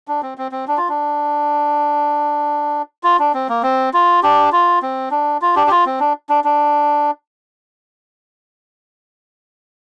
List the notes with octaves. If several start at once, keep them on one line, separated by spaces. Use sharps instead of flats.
D4
C4
C4
C4
D4
F4
D4
F4
D4
C4
A#3
C4
F4
D4 G4
F4
C4
D4
F4
D4 G4
G4
F4
C4
D4
D4
D4